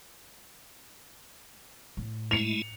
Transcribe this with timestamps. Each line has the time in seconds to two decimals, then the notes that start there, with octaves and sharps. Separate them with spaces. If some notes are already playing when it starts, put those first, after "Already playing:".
1.97 A2
2.31 G#3 A3 E4 C#7 F7